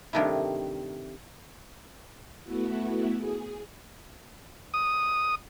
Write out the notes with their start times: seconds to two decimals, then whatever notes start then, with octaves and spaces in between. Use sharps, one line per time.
0.13 G2 C3 D#3 A3 E4
2.43 A3 B3 E4 F#4
3.16 G#4
4.74 D#6